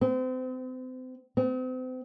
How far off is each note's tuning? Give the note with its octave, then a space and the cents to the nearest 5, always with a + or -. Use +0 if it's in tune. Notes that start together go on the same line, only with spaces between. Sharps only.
C4 -35
C4 -40